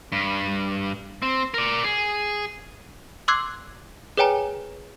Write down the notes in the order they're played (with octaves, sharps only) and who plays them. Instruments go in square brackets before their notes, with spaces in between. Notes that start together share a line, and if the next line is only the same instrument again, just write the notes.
[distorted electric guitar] G2
C4
A#4 D5
G#4
[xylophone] C6 D6 E6 F#6 G#6 C7
G#4 B4 C#5 G5 G#5 A#5